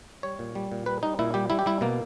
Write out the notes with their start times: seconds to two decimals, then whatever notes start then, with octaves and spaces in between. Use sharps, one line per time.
0.23 G3 C#5
0.39 A#2
0.55 G3
0.72 A#2
0.86 G3 B4
1.03 G3 D#4
1.19 A#2 E4
1.34 G3 G4
1.50 G3 E4
1.59 G4
1.66 G3 E4
1.81 B2 A#3